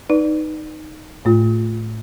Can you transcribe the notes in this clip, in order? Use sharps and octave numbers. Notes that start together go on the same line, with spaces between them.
D#4 B4 D5
A2 A3 F4